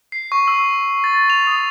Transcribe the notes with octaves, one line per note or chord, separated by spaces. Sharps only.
C7
C#6
E6
A6
F7
D#6